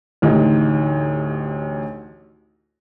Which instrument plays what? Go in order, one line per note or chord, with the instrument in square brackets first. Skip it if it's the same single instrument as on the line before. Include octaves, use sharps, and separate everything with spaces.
[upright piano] A1 D2 D#4 G4